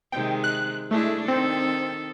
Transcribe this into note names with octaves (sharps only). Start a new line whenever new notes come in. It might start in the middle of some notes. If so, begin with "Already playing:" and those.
C3 D#3 G#3 G5
F#6
G#3 A3 D4 E4
D#3 C4 A4